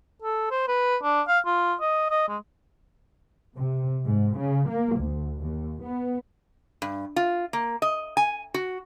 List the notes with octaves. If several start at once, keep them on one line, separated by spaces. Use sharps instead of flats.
A4
C5
B4
D4
F5
F4
D#5
D#5
G#3
C3
G#2
C#3
A#3
D2
D#2
B3
G2
F4
A#3
D#5
G#5
F#4